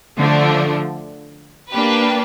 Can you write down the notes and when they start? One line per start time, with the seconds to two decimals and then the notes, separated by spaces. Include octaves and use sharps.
0.17 D3 F3 A3 D4
1.71 A#3 D4 G4 B4